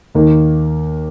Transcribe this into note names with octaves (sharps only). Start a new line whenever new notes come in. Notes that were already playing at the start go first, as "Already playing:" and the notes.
D#2 D#3 A#3